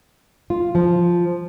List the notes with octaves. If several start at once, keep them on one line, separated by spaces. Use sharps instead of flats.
F4
F3